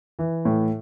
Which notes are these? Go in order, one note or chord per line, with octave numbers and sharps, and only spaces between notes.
E3
A2